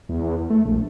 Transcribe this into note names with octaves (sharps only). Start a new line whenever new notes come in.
E2
A3
A#1